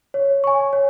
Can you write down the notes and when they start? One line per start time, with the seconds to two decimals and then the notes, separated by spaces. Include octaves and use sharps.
0.14 C#5
0.44 G#5 C#6
0.73 C#5